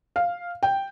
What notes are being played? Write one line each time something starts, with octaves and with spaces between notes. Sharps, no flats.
F5
G5